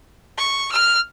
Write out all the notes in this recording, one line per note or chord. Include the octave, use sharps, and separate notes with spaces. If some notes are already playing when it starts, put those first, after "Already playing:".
C#6
F6